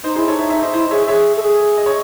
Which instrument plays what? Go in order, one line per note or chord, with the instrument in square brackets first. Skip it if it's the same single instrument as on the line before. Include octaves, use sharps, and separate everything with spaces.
[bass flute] D#4 [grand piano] C5 D#5
[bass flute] E4 [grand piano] G#4 C5
[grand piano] A4 C#5
[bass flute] D#4
[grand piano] C#5 E5
C#5 E5
C5 D#5
[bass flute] E4 [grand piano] C5 D#5
[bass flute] G#4 [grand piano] C#5 E5
[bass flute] G#4 [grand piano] C#5 E5
[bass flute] A4
G#4
[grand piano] D#5
C#5